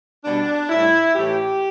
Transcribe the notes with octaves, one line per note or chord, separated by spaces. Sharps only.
B2 G3 D4
A2 G3 E4
A2 E3 A3 G4